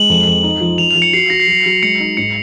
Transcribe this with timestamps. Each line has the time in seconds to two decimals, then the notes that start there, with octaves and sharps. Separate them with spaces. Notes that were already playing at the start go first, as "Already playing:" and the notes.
Already playing: G#3 F#7
0.10 F2
0.27 F2
0.43 D#4
0.61 F3
0.78 F3 F7
0.91 F3 F7
1.02 C#7
1.13 F#4 C7
1.30 F#4 A#6
1.40 C7
1.47 F#3
1.66 F#3
1.83 G#3 C#7
2.00 D#4
2.17 G#2 C#7